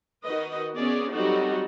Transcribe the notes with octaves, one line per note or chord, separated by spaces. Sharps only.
D#3 D#4 F#4 B4 D#5
B3 C#4 G#4 D5
F#3 G3 C4 D#4 F#4 A4